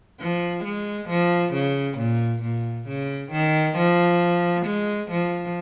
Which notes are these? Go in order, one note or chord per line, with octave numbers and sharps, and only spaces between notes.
F3
G#3
F3
C#3
A#2
A#2
C#3
D#3
F3
G#3
F3